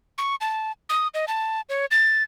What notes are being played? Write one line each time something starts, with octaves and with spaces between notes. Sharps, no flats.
C#6
A5
D#6
D#5
A5
C#5
A6